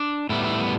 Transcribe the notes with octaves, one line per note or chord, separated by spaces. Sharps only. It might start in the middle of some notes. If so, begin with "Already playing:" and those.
Already playing: D4
A2 G3 B3 E4
E4
B3